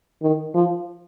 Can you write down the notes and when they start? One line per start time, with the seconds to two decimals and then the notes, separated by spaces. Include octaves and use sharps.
0.22 D#3
0.54 F3